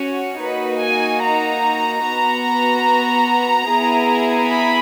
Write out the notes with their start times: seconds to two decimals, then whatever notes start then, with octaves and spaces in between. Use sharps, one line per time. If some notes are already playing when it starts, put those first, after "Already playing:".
Already playing: C#4 F#4 C#5
0.39 A#3 D#4 F#4 B4
0.80 G#5
1.21 A#5
2.03 B3 F#4
3.67 B3 E4 G#4
4.48 B5